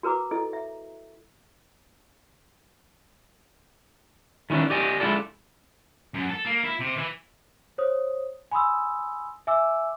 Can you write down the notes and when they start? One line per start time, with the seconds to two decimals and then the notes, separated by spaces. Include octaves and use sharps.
0.03 F#4 A#4 B4 A#5 D6
0.31 E4 A4 D#5
0.53 E5
4.50 D#3 E3 A#3 C#4 D4
4.70 G4 D5 D#5 G#5
5.00 G#3 D4 E4 F4 A4
6.14 F#2
6.29 A4
6.45 A#3
6.64 E4
6.80 C3
6.97 E3
7.78 C5 C#5 D#6
8.51 G#5 B5 C6 D#6 E6
9.47 E5 G#5 D6 E6